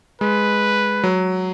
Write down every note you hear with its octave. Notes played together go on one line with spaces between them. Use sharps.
G#3 B4
F#3